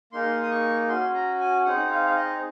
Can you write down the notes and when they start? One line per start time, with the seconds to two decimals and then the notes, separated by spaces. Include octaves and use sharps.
0.12 A#3 D#4 G#4 C6
0.43 D#6
0.51 C#6
0.89 C#4 F#4 C6
1.14 A#5
1.40 G#5
1.65 C4 D#4 G#4 F#5
1.91 F5
2.06 F5
2.16 D#5